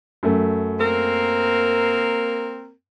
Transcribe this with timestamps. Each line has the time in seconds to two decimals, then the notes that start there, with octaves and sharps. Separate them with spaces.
0.23 F#2 A3
0.79 A#3 C4 A#4